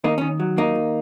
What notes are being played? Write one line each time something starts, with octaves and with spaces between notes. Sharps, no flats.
D#2 A#3 D#4
D#3 C#4
F#3
D#2 A#3 D#4
D#2